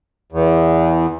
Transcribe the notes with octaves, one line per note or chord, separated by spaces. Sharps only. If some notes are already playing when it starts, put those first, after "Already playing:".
E2